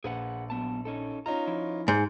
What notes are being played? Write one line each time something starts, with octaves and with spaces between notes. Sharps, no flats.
A#1 G#4 B4 F#5
F#2 B3 A5
C#4 D#4 A4
C#4 D#4 F4 A#5
F3 E4
G#2